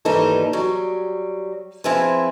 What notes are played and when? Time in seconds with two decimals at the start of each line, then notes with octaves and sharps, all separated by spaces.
0.05 D#2 G#2 E3 G3 D#4 A4
0.53 F#3 G3
1.84 F3 C4 E4 G#4 B4